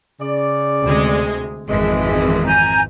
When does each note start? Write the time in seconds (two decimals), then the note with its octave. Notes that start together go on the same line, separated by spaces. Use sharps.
0.21 C#3 D5
0.82 D2 C3 G#3
1.68 G#1 F2 B2 E3 G#3
2.46 G#5 A#5 G6